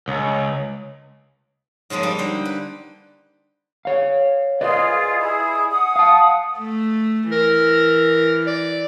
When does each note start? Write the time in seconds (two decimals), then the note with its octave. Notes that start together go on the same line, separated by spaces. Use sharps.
0.08 C#2
1.90 G#2 C#3 F3 G#3 A#3
2.03 G3 A#3 D#4
2.19 D3 G4 C5
2.45 B4
3.85 C#5 F5
4.61 F4 G#4 B4 D5 D#5
5.19 E4 G#4
5.70 F#5 D#6
5.96 F5 A5
6.59 A3
7.32 E3 A#4
8.47 D5